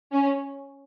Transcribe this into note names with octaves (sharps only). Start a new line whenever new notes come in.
C#4